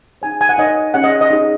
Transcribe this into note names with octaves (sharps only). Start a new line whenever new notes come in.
D#4 G#4 C#5 G#5
G#5
F#5
D#4 A#4 C#5 D#5
C#4 G#4 C#5 F#5
D#5
D#5
D#4 G#4 C#5